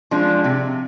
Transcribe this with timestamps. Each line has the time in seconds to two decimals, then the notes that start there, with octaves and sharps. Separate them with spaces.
0.11 F3 G#3 D4
0.44 C3